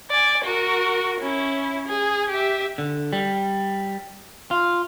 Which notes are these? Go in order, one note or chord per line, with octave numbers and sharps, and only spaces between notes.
D5 G#5
F#4 A#4
C#4 E4
G#4
G4 E5
D3
G3
F4